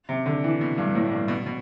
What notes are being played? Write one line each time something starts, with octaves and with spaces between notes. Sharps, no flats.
C3
D3
E3
B2
G2
A2
G2
B2
B2